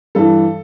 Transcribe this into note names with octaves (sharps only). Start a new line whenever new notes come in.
G2 E3 A4